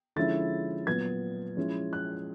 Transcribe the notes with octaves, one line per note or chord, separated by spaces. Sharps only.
D3 F3 G#3 C#4 E4 A6
A#2 F#3 B3 G#6
F3 G#3 C#4 E4
F#6